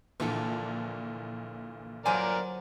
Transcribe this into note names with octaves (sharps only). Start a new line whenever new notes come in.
A#1 A#2 D3 E3 A4
G2 F#3 A#3 A#4 C5 D5 G#5